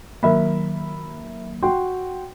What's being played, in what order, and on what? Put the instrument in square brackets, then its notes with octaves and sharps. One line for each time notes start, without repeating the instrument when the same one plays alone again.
[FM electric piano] D#3 F#3 A#3 [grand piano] A#4 E5 B5
[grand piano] F#4 G5 C6